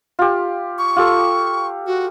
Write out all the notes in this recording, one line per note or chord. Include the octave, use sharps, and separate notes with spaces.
F4 G4
C#6
F4 G4 A4
F#4